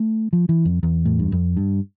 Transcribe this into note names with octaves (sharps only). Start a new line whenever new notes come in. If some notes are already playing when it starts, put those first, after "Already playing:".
Already playing: A3
F3
E3
F2
E2
A2
G2
F2
G2